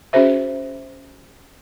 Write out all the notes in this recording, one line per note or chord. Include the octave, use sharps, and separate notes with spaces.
C#4 F#4 G#4 C5 E5